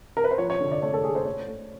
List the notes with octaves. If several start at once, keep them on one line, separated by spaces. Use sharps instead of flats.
A#4
B4
C5
F3 C#5
C#5
D3
D5
A3 C#5
A4
A3 G#4
C5
A3 C#5
A3